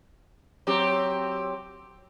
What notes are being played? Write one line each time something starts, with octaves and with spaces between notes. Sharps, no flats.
F#3 C4 G4